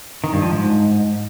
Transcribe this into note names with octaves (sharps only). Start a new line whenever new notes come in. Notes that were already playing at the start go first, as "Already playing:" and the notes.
D#3
G2
F3
G#2